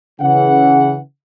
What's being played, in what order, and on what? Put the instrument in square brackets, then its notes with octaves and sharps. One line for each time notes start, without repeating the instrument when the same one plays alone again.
[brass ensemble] C#3 E3 F#5